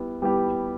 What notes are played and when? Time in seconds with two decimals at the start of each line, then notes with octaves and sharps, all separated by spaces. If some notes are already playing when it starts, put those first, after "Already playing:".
Already playing: G3 B3 E4
0.22 G3 B3 E4 G4